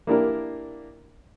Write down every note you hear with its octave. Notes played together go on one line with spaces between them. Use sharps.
A#3 D4 E4 G4 A#4